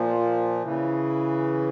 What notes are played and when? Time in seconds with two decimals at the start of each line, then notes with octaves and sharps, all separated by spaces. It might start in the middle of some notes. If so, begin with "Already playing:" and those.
Already playing: A#2 F3
0.63 C#3 E3